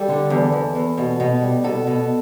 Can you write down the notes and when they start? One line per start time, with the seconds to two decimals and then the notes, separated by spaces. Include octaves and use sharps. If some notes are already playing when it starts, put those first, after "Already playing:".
Already playing: G3 A4
0.08 D3
0.30 E2
0.52 E2
0.75 E2
0.98 B2
1.20 B2
1.42 G3
1.64 B2 A4
1.87 B2